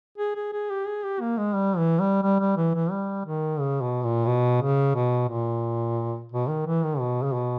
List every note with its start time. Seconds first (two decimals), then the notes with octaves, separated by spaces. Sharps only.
0.18 G#4
0.35 G#4
0.53 G#4
0.70 G4
0.87 G#4
1.04 G4
1.20 A#3
1.38 G#3
1.55 G3
1.77 E3
2.00 G3
2.23 G3
2.40 G3
2.57 E3
2.75 E3
2.91 G3
3.26 D#3
3.60 C#3
3.82 B2
4.04 A#2
4.27 B2
4.62 C#3
4.95 B2
5.29 A#2
6.32 B2
6.49 D#3
6.66 E3
6.83 D#3
6.99 B2
7.23 C#3
7.34 B2